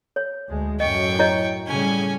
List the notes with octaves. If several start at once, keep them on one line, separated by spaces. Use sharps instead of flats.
C#5
D2 G#3
F#2 A2 F#3 D#5 G5 C#6
E4 C#5 D#5
A2 C#3 G3 C#4 G#5